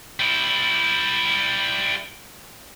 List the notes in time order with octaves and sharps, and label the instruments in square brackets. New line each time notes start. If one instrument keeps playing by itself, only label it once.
[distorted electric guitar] G3 E4